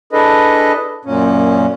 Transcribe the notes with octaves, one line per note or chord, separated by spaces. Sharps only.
D4 E4 G#4 A4 B4 D#5
F#2 A#2 C#4